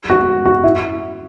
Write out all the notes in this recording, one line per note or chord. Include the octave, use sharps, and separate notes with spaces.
F#4
F#4
E4